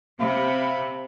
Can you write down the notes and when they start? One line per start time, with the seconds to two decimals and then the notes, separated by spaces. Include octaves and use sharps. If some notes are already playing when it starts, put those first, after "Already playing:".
0.19 C3 E5 F5 B5